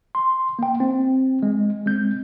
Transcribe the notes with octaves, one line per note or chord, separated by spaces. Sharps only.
C6
A#3 G5
C4
G#3
G#3 C4 G6